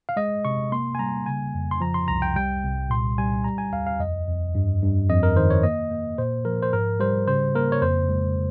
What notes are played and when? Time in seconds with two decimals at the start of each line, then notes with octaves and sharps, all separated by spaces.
0.09 F5
0.16 G#3 D#5
0.45 C3 C#6
0.72 A#3 C6
0.95 G#5
0.99 G3 A#5
1.26 C#3 G#5
1.54 F2
1.71 C6
1.80 F3 A#5
1.94 C6
2.08 C2 A#5
2.22 G5
2.36 G3 G5
2.63 C2
2.90 A#2 C6
3.18 G3 G#5
3.44 G3 A#5
3.58 G#5
3.72 D#2 F5
3.87 F5
3.99 F2 D#5
4.28 F2
4.55 G2
4.82 G2
5.09 F2 D#5
5.23 A#4
5.36 D#3 C5
5.50 C#5
5.63 A#3 D#5
5.91 A#3
6.18 A#2 C5
6.45 F3 A#4
6.62 C5
6.73 G#2 A#4
7.00 G3 C5
7.27 C#3 C5
7.55 A#3 A#4
7.72 C#5
7.82 F2 C5
8.09 G#3